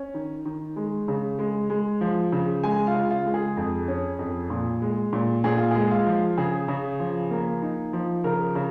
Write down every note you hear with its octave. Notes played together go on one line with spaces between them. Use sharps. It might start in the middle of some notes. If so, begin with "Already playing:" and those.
Already playing: C#4
D#3
D#3
G#3
C#3
G#3
G#3
F3
C#3
G#3 G#5
F4
C#3
F4
G#3
G#4
F2
C#4
F2
A#2
G#3
A#2
A#2 G#4
F4
G#3 G#4
F4
F3
C#3 G#4
C#3
F3
A#3
D#4
F3
C#3 A#4
C#3